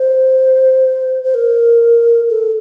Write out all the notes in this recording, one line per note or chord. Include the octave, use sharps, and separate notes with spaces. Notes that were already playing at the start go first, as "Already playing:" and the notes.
Already playing: C5
C5
A#4
A4